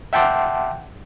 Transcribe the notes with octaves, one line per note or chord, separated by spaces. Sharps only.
E5 F#5 G5 A5 C6 D6